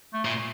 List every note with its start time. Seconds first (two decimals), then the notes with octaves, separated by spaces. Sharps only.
0.14 A3
0.25 A#2